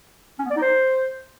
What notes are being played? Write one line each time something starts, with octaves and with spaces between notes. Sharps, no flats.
C#4
B3
D5
D#4
C5